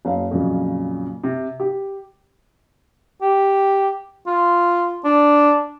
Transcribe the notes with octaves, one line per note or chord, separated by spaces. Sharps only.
F#1 F5
F2 A#2 C#3 F#3
C3
G4
G4
F4
D4